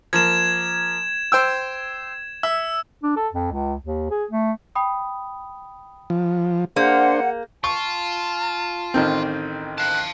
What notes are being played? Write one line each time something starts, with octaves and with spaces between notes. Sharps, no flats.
F3 A#3 G#6 E7
C5 G5 E6
E5 E6
D4
A4
F2
C#2
D#2
G#4
A3
G5 B5 D#6
F3
A#3 D4 G#4 C5 F#5 F6 G6
F4 A5 C#6
A1 D#3 C4
F5 A5 F#6